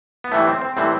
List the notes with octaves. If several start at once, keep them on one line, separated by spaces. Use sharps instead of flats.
B3
A2 E3 G3 A3
C4
C4
A2 E3 G3 C4